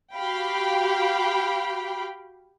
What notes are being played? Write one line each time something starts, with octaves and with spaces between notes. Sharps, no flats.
F#4 G4 F5 G5 B5